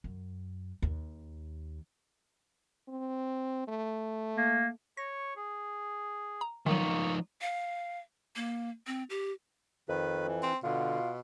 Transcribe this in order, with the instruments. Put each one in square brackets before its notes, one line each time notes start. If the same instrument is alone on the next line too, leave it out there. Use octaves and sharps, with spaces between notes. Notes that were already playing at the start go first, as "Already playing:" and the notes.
[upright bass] F#2
D#2
[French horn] C4
A3
[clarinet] A#3
[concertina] C#5 C#6 [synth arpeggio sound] A#6
[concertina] G#4
[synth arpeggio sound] A#5
[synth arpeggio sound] D#3 F#3 [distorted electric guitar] F3 D#4 [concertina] A#3 C#6
[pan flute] F5
A#3
C4
G4
[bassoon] F2 [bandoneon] D#3 B4
[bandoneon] E3
[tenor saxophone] C4
[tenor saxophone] B2 [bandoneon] D3 [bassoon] F4